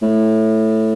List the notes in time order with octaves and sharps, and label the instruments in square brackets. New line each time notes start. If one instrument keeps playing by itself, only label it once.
[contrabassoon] A2